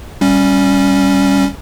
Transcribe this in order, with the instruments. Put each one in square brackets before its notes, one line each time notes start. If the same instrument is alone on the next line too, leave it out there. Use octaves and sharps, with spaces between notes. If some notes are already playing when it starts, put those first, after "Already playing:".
[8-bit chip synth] G3 C#4